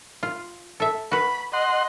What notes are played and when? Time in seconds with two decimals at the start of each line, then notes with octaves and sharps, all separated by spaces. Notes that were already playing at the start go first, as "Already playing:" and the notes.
0.23 F4
0.80 A4 E5
1.12 F#4 B4 B5
1.53 D#5 F#5 C6